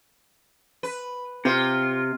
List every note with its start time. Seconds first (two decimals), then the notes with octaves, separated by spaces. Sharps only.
0.83 B4
1.45 C3 F4